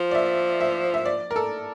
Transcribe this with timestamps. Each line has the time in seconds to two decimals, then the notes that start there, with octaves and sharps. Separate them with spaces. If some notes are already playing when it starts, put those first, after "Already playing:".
Already playing: F3
0.11 D5
0.15 E5
0.60 E5
0.94 E5
1.05 D5
1.31 A#4
1.36 A4